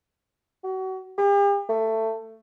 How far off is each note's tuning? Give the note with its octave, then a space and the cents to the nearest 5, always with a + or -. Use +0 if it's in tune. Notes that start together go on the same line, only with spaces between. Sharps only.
F#4 +30
G4 +45
A3 +15